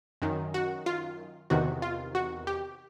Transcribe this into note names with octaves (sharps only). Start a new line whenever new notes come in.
F#2 D#3
F#4
F4
E2 C3 D#3 F#4
F4
F#4
G4